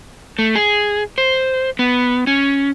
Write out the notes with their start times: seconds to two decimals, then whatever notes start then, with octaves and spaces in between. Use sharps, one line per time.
0.39 A3
0.55 G#4
1.18 C5
1.79 B3
2.27 C#4